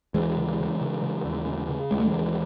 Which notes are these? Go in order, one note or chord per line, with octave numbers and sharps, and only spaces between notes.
D#2 E3 G#3
C#3
C#3
C#3
C#3
D#2
C#3
C#3
D#2 G#3
A3
E3 G#3
D#2